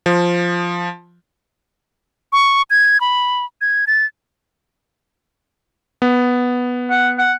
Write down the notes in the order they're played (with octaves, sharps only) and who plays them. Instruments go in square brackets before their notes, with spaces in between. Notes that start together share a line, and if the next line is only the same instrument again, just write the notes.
[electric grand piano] F3
[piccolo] C#6
G#6
B5
G#6
A6
[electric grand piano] B3
[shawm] F#5
F#5